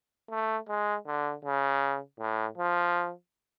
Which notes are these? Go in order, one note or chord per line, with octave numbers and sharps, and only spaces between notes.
A3
G#3
D3
C#3
A2
F3